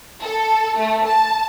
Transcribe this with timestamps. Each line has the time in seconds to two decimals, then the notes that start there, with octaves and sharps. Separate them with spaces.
0.21 A4
0.77 A3
1.06 A5